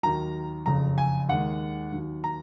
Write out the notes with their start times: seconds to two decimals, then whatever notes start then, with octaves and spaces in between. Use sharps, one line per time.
0.03 D#2 D#3 F#3 A#5
0.66 F#1 F2 C#3 A#5
0.98 G#5
1.29 D#2 D#3 G#3 F#5
1.92 D#2 D#3 F#3
2.24 A#5